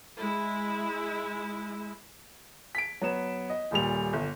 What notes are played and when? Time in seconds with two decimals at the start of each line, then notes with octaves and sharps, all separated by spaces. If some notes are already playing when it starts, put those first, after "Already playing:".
0.19 G#3 E4
2.75 B6 D7
3.01 F#3 B3 E7
3.50 D#5
3.71 D#1 A#2 G3 F7
4.13 G1